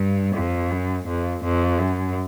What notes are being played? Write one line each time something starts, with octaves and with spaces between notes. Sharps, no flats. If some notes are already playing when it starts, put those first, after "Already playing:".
Already playing: G2
F2
F#2
F2
F2
F#2